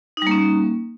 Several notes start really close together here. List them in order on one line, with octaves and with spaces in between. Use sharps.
D#4 G3 A#3 C#4